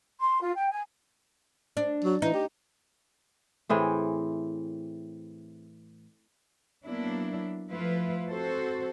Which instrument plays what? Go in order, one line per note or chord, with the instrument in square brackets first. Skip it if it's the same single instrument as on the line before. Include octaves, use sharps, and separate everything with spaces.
[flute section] C6
F4
G5
G#5
[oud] D4
[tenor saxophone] F#3
[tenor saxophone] E3 [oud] D#4
[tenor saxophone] G4
[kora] A2 E3 C4 G#4
[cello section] F#3 A#3 B3 D4 E4
F3 A3 E4 F4 B4
C4 F#4 A4 C5